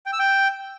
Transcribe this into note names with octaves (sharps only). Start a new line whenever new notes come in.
G5
E6
G5